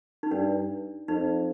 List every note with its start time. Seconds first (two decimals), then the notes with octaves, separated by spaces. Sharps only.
0.23 D#4
0.31 G2 D4
1.08 F2 D#4